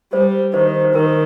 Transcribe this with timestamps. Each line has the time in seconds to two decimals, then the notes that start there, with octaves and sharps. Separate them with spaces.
0.13 G3 C5
0.54 D#3 C5
0.84 C5
0.94 D#3 A#4